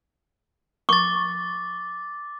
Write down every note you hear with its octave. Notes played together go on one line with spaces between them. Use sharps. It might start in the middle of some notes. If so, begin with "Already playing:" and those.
C#6 D6 A6